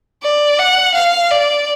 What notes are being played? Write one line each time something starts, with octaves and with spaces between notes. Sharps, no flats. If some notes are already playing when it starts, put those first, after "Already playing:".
D5
F#5
F5
D5